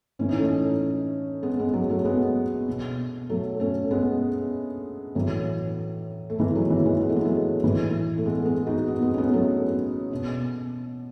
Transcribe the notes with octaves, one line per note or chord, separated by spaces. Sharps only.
A2 E3 C#4
D#4
A3 C#4
G#3 B3
G#3 B3
F#3
F#3 A3
G#3 B3
B2
F#3 A3
A3 C#4
G#3 B3
A2 E3 F#3
A3
E3 G#3
F#3
E3
E3 G#3
B3
A3
G#3
F#3 A3
A2 E3
A3
G#3 B3
G#3 B3
D#4 F#4
B3 D#4
G#3 B3
C#4
G#3 B3
F#3 A3
B2